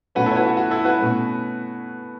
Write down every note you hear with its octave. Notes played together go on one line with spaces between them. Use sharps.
B2 A3 C#4 F#4 B4
E4 A4
C#5
F#4 B4
F#4
F#4
E4 A4
F#4 B4
B2 A3 C#4